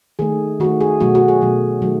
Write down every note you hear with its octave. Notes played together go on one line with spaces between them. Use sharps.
D#3 A3 G#4
D#3 A3 F#4
G#4
B2 F#3 A3 F#4
F#4
G#4
B2 F#3 A3
D#3 F#3 A3